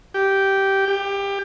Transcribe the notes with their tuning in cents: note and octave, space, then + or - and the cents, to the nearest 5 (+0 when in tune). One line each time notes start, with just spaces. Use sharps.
G4 -10
G4 +20